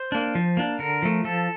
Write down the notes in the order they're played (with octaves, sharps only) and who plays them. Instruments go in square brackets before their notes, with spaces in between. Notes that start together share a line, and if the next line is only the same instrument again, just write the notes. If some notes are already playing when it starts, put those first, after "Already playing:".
Already playing: [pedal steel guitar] C5
A#3 D4
F3
A#3 D4
D3 A#4
F3 A3
F3 A4